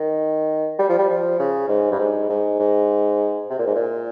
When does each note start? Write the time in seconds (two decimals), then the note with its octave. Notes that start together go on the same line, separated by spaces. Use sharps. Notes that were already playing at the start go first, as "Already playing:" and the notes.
Already playing: D#3
0.79 G3
0.89 F3
0.99 G3
1.09 F3
1.39 C#3
1.69 G#2
1.92 G2
1.99 G#2
2.30 G#2
2.60 G#2
3.50 C3
3.59 A#2
3.67 G#2
3.75 A#2